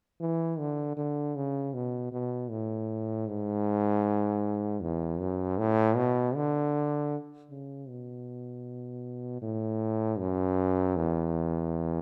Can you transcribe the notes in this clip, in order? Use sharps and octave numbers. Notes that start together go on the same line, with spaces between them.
E3
D3
D3
C#3
B2
B2
A2
G#2
E2
F#2
A2
B2
D3
C#3
B2
A2
F#2
E2